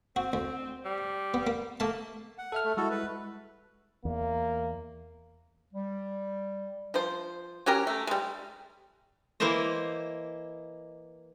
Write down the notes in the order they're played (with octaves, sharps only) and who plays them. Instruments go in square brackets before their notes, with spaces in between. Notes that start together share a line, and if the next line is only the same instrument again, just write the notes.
[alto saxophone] C4 [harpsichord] F#4
[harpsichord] D2
[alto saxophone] G3
[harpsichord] B3
A#3
[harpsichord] A3 A5 [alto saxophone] A#3
[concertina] F#5
[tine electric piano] A4 E5 F6
[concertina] A3
[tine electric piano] G3 G#3 E4 [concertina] F#4 A4
[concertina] B4
[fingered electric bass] E2 [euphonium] A#3
[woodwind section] G3
[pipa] F3 C5
F#3 C#4 G4 A#4
A3
G3 G#3
[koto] E3 A#3 E4 A#4 C5 D#5